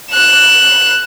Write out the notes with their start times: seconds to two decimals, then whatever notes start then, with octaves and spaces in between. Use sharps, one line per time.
0.12 F#6 E7